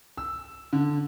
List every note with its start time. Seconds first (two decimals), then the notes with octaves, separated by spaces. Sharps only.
0.18 E6
0.73 D3